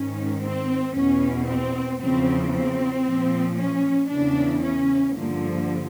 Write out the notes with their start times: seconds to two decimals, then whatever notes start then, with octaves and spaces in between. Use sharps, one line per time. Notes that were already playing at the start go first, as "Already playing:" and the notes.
Already playing: G#2 D#3 C#4
0.43 C4
0.95 E2 B2 C#4
1.48 C4
2.00 E2 C#3 F3 C4
2.53 C4
3.05 A#2 F3
3.58 C#4
4.10 E2 C#3 E3 D4
4.64 C#4
5.16 G2 D3 F3 A#3